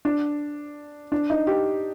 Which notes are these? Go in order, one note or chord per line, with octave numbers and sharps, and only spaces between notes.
D4
D4
D#4
G4